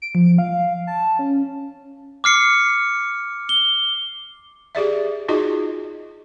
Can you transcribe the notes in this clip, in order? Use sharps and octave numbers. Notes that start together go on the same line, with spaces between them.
D7
F3
F5
A5
C#4
D6 F6 C7 C#7
G7
G4 G#4 D5 E5
D#4 F4 F#4 G#4 D#5